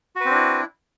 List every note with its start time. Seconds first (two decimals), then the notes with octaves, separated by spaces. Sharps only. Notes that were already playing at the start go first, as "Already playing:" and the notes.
0.16 F#4
0.21 B4
0.25 C4
0.30 D4
0.35 E4